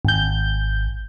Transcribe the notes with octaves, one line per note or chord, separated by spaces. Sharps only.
G#1 G6